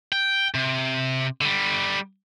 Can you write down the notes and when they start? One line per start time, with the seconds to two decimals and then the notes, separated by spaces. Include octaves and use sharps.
0.12 G5
0.55 C3
1.41 D3 G3